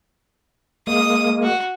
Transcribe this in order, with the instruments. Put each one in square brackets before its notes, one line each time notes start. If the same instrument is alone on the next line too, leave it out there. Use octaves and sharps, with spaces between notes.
[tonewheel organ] G#3 A#3 [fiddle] D#6
[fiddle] F#4